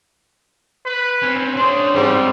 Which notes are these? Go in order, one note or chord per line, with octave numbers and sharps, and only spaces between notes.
B4
C4 C#4
C#4 D4 G#4 C5
G#2 G3 C4 D#5